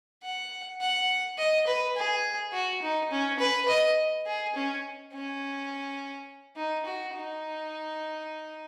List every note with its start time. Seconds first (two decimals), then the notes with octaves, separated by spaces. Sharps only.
0.22 F#5
0.81 F#5
1.38 D#5
1.67 B4
1.96 G#4
2.53 F#4
2.82 D#4
3.11 C#4
3.39 B4
3.68 D#5
4.26 G#4
4.55 C#4
5.13 C#4
6.56 D#4
6.85 F#4
7.14 D#4